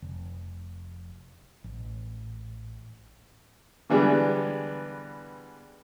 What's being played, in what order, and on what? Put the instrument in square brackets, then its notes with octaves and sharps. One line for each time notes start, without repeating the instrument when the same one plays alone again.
[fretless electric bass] F1
A1
[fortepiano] D3 E3 G3 G#3 B3 D4